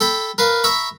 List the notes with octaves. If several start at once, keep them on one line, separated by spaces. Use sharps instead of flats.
A4 G5 B5
A#4 B4 F5
E5 A#5 B5 C#6